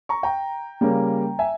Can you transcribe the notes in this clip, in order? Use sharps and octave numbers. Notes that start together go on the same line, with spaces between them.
A#5 C#6
G5 A#5
C#3 G3 A#3 C#4
E5 G#5